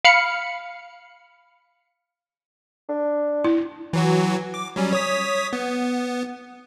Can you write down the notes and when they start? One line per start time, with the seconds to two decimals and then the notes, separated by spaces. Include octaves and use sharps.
0.05 F5 B5 F6 C#7
2.89 D4
3.44 E4
3.93 E3 F#3 F#4
4.54 D6
4.76 F#3 G3 C#4
4.93 C#5 D#6 B6
5.53 B3